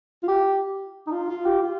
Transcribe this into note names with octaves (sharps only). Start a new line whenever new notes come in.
F4
G4
D#4
F4
F4
G4
F4